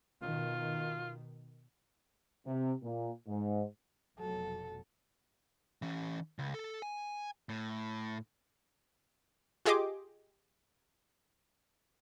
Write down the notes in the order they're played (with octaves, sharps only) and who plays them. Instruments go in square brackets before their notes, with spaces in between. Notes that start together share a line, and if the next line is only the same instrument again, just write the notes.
[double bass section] B2 D#3 [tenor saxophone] F4
[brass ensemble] C3
A#2
G#2
[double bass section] F1 B2 F#3 [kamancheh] A4
[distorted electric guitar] E3 C#4
C#2
A4
G#5
A2
[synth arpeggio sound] F4 G4 G#4 D#5 C6 D6